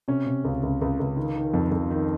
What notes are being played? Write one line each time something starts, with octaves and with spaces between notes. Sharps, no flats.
C3 C#4
C3
C#2
C#2
C#2
C#2
D#3
D#3
F2
F2
D#3